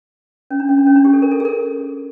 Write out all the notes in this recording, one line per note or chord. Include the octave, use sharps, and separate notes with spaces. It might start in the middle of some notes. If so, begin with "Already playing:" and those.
C#4
D4
C#4
D4
C#4
D4
G4
A4
A#4
A4
G#4
A#4
A4